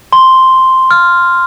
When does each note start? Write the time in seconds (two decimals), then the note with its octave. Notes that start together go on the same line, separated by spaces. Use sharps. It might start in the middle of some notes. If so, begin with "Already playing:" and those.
0.13 C6
0.91 F6